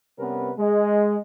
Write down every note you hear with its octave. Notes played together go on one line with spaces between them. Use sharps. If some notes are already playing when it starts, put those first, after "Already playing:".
C3 G3 B3 C#4 A#4 B4
G#3